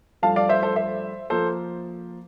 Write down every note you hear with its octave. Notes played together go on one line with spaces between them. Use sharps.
G2 F3 A3 F5 A5
D5 F5
C5 E5
A4 C5
C5 E5
F3 A#3 A4 C5